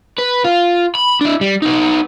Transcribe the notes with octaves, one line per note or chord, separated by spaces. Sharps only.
B4
F4
B5
D4 E4
G3
B3 D#4